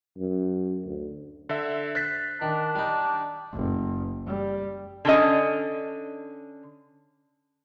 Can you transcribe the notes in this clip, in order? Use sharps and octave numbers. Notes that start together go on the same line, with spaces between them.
F#2
D2
D3 E5
C5 F#6 A6 B6
D#3 D4
G3 D#4
F#1
G3
D3 C#4 D#5